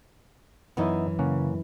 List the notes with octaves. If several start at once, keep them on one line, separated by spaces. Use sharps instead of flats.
F#2 E3 B3 D#4 E4
C#3 A#3 C#4 F#5